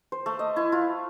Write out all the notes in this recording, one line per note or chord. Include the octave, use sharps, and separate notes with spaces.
C5
A3
D#5
E4
F4